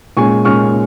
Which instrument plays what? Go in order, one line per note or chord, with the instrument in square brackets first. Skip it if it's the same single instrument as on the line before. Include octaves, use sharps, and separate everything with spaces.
[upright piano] A#2 G#3 C#4 G#5 C#6
A#2 G#3 C#4 C#6 F6